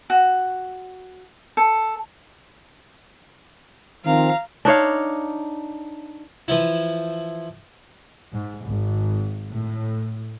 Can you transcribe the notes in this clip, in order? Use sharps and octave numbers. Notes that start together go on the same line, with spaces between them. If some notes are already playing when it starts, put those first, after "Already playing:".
F#4
A4
D#3 F3 C4 F5 A#5
D4 D#4 C#5 F5
E3 F3 E4
G#2
G#1
A2